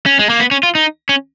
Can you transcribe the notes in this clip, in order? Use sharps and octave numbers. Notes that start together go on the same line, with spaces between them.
C#4
G#3
A#3
B3
C#4
F4
D#4
C#4